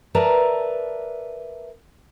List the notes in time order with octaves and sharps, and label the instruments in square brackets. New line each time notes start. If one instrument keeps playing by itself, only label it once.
[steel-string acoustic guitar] A#4 B4 D5 E5 A5 A#5